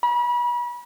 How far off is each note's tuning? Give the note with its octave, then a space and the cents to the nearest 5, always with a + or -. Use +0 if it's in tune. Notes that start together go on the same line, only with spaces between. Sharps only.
B5 -35